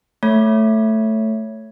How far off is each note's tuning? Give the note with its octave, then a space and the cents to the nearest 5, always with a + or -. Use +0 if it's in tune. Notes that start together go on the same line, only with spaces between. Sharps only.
A3 +5 C#5 +0 E5 -10